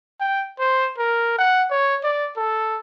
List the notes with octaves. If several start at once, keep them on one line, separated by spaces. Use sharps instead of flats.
G5
C5
A#4
F#5
C#5
D5
A4